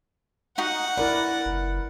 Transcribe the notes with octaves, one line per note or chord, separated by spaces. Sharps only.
D#4 F#4 F#5
E4 A#4 B4 D5
F#1